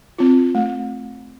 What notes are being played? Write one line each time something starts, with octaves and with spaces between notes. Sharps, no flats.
C4 F4
A3